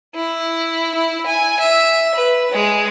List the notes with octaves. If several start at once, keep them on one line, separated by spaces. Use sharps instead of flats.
E4
E4
G#5
E5
B4
G#3